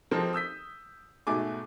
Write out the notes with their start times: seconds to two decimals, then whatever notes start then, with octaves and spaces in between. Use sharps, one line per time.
0.11 F3 G#3 A#3 C4 A4 A#4
0.33 D#6 E6 G6 B6
1.27 G#2 B2 A3 G#5 D6